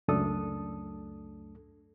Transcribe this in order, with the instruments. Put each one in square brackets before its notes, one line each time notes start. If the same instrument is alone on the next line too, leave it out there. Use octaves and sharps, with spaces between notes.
[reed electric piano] C#2 F#2 A3 D4 A4 D#6